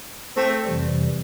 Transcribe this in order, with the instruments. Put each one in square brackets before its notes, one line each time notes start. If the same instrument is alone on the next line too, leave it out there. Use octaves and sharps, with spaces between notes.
[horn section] A3 C4
[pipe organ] F2 C3 E3 G3